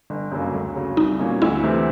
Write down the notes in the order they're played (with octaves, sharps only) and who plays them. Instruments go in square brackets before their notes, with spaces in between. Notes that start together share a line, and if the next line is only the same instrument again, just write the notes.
[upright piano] G1
F#2 C#3 F#3 A#3
D2
C#3 F#3
[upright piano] C2 [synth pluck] D#4
[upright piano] A#2 F#3 A#3 C#4
[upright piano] D2 [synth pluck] E4
[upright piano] C3 E3 A3 C4